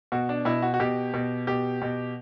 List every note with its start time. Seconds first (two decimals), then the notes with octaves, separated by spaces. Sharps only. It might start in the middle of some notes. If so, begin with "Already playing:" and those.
0.12 B2 F#4
0.29 D4
0.45 B2 E4
0.62 F#4
0.74 F#4
0.80 B2 G4
1.14 B2
1.47 B2 G4
1.82 B2